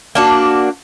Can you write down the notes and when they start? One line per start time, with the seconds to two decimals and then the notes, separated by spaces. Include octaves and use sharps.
0.15 A#3 D4 F#4